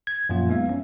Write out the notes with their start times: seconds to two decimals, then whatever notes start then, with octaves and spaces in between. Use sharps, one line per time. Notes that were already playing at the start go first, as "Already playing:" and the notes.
0.07 G#6
0.29 F#2 A#2 F3 A#3 F4
0.49 G#3 B3 D#4 E5 F5
0.69 C#4